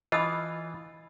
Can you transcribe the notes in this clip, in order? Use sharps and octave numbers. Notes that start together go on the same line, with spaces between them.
E3 F4 D#5 B5 D#6